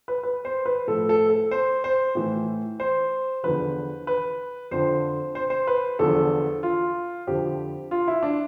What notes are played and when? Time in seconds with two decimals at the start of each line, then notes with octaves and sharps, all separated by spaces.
0.08 B4
0.23 B4
0.45 C5
0.66 B4
0.87 A2 F3 A4
1.09 A4
1.30 A4
1.51 C5
1.84 C5
2.15 A2 E3
2.80 C5
3.43 E2 D3 F3 B4
4.07 B4
4.71 F2 D3 F3 C5
5.35 C5
5.50 C5
5.67 B4
5.99 E2 D3 F3 A4
6.63 F4
7.27 F2 D3 F3 G4
7.91 F4
8.08 E4
8.23 D4